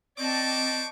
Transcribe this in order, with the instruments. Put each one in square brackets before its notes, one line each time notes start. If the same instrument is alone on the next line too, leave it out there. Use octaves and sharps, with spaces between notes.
[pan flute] C4 [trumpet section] C5 C#6 D6 [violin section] D5 D#5 A5